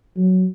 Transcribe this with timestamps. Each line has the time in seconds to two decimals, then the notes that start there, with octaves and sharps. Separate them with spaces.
0.17 F#3